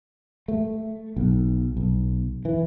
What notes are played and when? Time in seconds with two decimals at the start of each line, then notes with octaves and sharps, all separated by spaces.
0.48 A3
1.17 B1
1.77 B1
2.45 E3